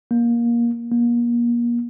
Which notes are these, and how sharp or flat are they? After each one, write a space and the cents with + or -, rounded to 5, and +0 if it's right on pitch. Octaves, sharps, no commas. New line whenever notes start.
A#3 +20
A#3 +35